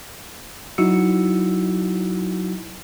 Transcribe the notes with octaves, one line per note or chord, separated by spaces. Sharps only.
F#3 D#4 E4 F#4 E6 C#7